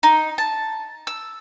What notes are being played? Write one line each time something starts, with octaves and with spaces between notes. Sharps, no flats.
D#4
A5
E6